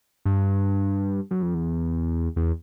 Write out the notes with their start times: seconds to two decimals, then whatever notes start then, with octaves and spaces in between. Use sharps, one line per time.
0.25 G2
1.31 F#2
1.42 F2
1.55 E2
2.36 E2